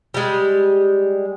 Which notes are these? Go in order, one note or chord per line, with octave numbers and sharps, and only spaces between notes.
G3 G#3